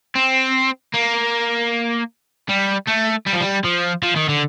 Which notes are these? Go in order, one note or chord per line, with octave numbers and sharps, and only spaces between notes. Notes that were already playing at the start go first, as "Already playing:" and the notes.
C4
A#3
G3
A3
G3
F3
G3
F3
F3
D#3
D3